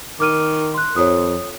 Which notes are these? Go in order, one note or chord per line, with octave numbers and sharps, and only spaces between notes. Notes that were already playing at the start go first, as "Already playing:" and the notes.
D#3 D6 F6 D#7
C6 F#6
F2 C#5 D#6